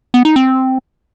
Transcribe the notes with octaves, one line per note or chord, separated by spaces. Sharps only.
B3
D#4
C4